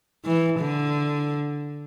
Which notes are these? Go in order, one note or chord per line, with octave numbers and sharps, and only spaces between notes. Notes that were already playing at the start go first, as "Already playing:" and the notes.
E3
D3